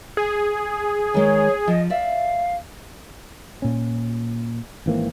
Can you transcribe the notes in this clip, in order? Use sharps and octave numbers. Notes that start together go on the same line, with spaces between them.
G#4
D#3 G#3 C#5
F3 D#5
D5 E5 F5
A#2 C#4
G#1 E3 A#3 C4